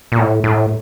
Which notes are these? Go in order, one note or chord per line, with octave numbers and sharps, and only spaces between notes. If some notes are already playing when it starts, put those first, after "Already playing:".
A#2
A2
A2